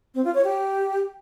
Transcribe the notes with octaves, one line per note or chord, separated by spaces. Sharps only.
C4
F4
C#5
G4